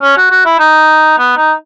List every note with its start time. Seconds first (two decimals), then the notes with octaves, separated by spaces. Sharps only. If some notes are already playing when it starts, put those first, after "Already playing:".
0.02 C#4
0.17 F#4
0.31 F#4
0.45 E4
0.59 D#4
1.18 B3
1.37 D#4